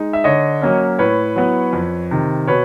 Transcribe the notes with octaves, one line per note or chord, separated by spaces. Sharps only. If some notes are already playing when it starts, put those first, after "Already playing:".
Already playing: G#3 D#4
E5
D3 C#5 D#5
F#3 A#3 C#4
A2 B4 C#5
F#3 B3 E4
F2
C3 D#3
B2 B4 C#5